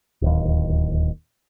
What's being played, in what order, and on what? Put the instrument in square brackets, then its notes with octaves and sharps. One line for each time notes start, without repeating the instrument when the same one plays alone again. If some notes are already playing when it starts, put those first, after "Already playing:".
[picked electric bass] D1 D#2